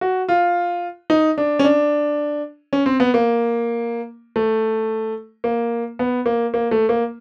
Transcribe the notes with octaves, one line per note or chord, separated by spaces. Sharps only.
F#4
F4
D#4
D4
C#4
D4
C#4
C4
B3
A#3
A3
A#3
B3
A#3
A#3
A3
A#3